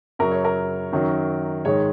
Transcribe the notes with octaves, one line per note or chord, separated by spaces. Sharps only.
F#2 C#3 F#3 A#4
C#5
A#4
F#2 D#3 F#3
G#2 D#3 G#3 C#5